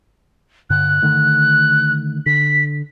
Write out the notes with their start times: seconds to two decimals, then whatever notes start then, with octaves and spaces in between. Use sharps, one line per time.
0.70 G2 D3 F#6
1.02 D3 D#3 A3
2.26 D3 B6